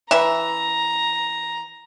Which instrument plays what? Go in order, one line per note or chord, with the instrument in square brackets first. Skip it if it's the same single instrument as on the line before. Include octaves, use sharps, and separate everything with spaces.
[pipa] E3 E5 [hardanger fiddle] A#5